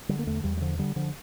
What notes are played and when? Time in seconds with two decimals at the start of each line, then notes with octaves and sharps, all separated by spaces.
0.09 D3 G3
0.19 A#3
0.27 E2 A3
0.44 E2 G3
0.57 G3
0.61 D3 F3
0.79 D3 G3
0.96 D3 F3